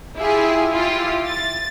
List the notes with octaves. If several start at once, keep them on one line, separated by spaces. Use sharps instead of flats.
E4 F4 G4 G#4
E4 F4 G4
A6